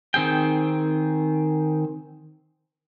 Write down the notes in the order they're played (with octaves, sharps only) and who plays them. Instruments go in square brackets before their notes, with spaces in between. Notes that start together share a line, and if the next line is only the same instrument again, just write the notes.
[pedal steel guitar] D#3 C4 G#4 G5